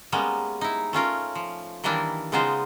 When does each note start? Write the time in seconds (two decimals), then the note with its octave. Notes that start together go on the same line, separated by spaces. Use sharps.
0.12 G3 G#3 A#3 B3 C#4
0.61 D#4 E4
0.93 A3 C#4 F4 A#4
1.35 F3
1.84 D#3 E3 G3 A#3 D4 E4
2.32 C#3 G#3 B3 D#4 F4 C5